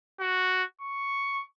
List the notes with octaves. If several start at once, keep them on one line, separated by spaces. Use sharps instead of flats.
F#4
C#6